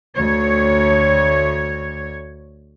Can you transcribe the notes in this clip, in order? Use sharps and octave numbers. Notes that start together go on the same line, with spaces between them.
D2 C#5